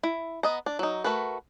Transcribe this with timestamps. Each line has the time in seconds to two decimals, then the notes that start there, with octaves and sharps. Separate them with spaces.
0.03 E4
0.43 B3 D#5 A#5
0.66 D4
0.79 F#3 D#4
1.04 A3 F#4 A#4 B4